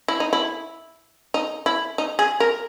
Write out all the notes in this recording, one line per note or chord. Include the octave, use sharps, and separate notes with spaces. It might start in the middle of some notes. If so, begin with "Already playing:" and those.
E4
D#4
E4
D#4
E4
D#4
G#4
A#4